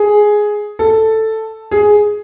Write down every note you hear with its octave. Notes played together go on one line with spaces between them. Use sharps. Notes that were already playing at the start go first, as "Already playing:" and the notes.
Already playing: G#4
A4
G#4